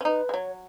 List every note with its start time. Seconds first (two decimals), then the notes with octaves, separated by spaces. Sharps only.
0.01 C#4
0.04 D#4 B4
0.29 G#3
0.34 F#3 C#5